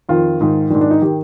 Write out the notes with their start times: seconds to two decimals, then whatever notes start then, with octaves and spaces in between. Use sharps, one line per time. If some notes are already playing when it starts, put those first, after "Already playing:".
0.09 F2 D#3 F4
0.41 G#2 D#3
0.70 D#3 D4
0.75 G#2
0.81 D4
0.91 D#4
1.02 D#3 G4